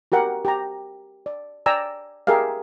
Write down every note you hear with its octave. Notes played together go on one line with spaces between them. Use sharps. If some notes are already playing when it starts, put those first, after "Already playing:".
F#4 G4 A#4 F#5
G4 A#5
D5
D5 G5 G#5 A#5 E6
G4 G#4 A#4 E5 F5